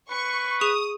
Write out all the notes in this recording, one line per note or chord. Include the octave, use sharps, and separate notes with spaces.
B4 C#6
G#4 C#6 D#6 E7